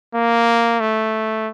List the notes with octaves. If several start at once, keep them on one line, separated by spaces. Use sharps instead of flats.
A#3
A3